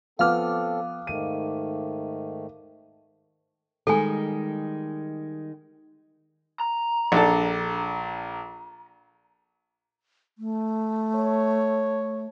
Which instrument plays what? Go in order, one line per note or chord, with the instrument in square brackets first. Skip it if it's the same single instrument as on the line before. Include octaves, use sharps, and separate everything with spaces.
[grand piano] F3 B3 F6 [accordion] C4 A4 [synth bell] F5 D6
[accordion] G#2 D#3 A3 [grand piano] D#7
[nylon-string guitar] D#3 G3 G#3 [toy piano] A4 G#5
[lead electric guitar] A#5
[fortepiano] A#1 D4 A4
[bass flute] A3
[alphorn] C#5